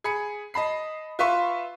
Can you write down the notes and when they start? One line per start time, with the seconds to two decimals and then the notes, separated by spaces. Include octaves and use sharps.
0.04 G#4 B5 C#7
0.54 D#5 A5 B5 C7
1.19 F4 B4 E5 F5 C6 C#6